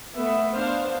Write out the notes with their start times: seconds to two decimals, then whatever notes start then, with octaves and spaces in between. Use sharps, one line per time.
0.16 A3 B3 E5
0.53 B3 D4 C5 F5